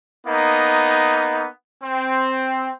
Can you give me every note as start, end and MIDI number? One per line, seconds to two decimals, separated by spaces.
0.27 1.47 58
0.27 1.47 59
0.27 1.47 63
1.84 2.70 60